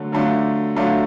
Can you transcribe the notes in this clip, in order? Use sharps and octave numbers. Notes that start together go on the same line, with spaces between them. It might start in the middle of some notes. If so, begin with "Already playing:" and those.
Already playing: D3 F#3 A3
D3 F#3 A3 D4 F4
D3 F#3 A3 D4 F4